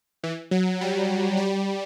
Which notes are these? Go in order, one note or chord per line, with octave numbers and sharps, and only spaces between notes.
E3
F#3
G3
G3